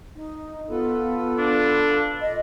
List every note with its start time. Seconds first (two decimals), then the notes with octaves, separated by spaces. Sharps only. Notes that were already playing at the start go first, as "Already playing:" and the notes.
0.15 D#4
0.69 B3 F4 A4 B4
1.38 D4
2.21 A#2 D#5